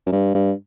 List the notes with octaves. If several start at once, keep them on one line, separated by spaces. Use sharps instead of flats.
F#2
G2
G2